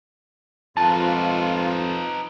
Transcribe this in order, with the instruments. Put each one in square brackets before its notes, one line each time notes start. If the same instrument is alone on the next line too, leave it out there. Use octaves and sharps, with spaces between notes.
[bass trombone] F2 [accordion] G#2 F4 [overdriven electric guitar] D#4 B4 [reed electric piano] A5